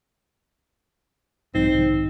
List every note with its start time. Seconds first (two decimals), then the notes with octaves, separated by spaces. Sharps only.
1.55 B1 G#2 F3 G3 C4 D#4
1.73 G#2 C3 D#3